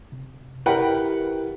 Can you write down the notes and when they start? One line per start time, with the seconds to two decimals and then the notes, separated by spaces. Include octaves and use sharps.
0.12 C3
0.66 E4 G4 A#4 B4 F#5 G5